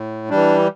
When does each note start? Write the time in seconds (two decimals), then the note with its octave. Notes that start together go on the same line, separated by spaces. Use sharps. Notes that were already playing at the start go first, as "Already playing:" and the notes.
Already playing: A2
0.30 E3 G3 D4